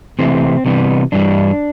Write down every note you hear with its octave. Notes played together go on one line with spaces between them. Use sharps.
C3 E3 A3 C4
C3 E3 G3 B3
G2 E3 G3 D4